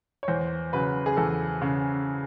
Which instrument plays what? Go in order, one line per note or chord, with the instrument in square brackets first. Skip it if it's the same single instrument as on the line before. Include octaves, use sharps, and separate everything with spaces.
[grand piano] C#5
E2 C5
C#3 F#3 B4
G#4
E2 A4
C#3